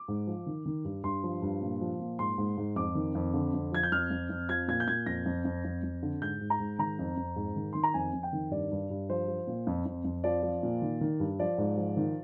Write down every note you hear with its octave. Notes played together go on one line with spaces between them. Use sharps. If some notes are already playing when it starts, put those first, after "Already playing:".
Already playing: D6
G#2
F3
D#3
D#3
G2
G2 C6
F3
G2
A#2
F3
A#2
G#2 C6
G#2
G#2
F2 D6
D#3
F2
D3
F2
F3 G#6
G6
F2 F6
F2
F2
F3 G#6
A#2 G#6
G6
A#2 G#6
F2 A#6
F2
F2
F2
F2
D3
G#2 G6
G#2
A#5
G#2
D#3 A#5
F2
F2
G#2
D#3
D#3 C6
A#5
F2 G#5
F2
G5
D#3
G2 D5
G2
G2
F3 C5
F3
A#2
F2
F2
F2
F3 D5
F3
A#2
D#3
D#3
G2
F3 D5
G#2
F3
D#3